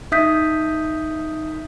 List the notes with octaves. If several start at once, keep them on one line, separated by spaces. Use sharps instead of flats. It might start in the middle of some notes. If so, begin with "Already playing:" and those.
D#4 E5 D#6 G6 B6